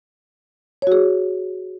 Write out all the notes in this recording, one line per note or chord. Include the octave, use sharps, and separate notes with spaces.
F#4 G#4 C#5